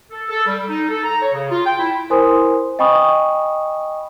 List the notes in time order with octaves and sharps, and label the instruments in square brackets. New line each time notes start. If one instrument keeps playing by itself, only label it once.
[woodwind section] A4
A4
G3
D#4
A4
A#5
C#5
C#3
F4
G5
E4
[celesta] E4 A#4 C5 G#5 C6 D#6
D#5 G5 G#5 B5 C#6 D#6